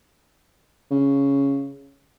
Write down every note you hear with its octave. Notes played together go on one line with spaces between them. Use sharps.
C#3